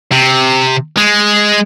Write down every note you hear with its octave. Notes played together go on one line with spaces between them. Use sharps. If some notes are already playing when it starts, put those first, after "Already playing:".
C3
G#3